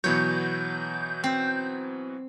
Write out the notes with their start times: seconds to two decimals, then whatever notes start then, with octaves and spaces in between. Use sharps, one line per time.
0.04 B2 E3 F#3 B3 C#5 G6
1.24 C4